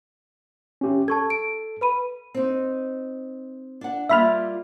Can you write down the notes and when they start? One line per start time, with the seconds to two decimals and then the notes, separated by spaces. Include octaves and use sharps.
0.81 C#4 G4
1.08 A4 A5 C#6 G#6
1.30 D7
1.81 B4 B5 D#7
2.34 C4 D#4
3.81 D4 F#5
4.09 G3 A#3 F4 E5 B5 F6